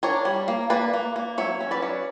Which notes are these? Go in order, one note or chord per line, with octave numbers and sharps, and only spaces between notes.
D4 A#4 C#5
G3
A#3
A#3 B4 D5
A#3
A#3
F#3 C#5 E5
C#4
B4 D5
F#3